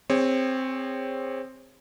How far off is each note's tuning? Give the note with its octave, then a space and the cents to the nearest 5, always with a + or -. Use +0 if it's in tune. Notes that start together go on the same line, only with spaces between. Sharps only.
C4 +0 G#4 -35 C#5 +0